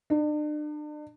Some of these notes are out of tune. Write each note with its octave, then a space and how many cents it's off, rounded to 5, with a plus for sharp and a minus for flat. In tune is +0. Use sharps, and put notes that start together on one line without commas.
D4 +40